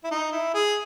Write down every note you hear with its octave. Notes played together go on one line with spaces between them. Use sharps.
E4
D#4
E4
G#4